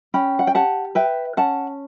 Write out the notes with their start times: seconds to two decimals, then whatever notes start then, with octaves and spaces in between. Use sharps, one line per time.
0.14 C#4 G5 B5
0.39 F#5
0.47 G5
0.54 G4 F#5 A5
0.95 B4 E5 G5
1.37 C#4 F#5 A5